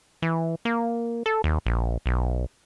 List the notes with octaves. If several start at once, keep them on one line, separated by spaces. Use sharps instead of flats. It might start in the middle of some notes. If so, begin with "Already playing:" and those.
E3
A#3
A4
D#2
A#1
B1